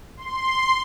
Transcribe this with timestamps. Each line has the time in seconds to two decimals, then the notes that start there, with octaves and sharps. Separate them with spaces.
0.17 C6